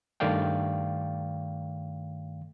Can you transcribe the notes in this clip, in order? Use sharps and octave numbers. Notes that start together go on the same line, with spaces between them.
G2 D#3 A3 D5 F5 G5